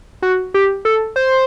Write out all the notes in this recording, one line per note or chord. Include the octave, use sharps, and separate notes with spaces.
F#4
G4
A4
C5